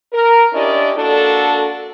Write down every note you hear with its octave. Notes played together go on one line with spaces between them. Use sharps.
A#4
C#4 D4 E4 G4 D5 D#5
A#3 D4 F#4 A4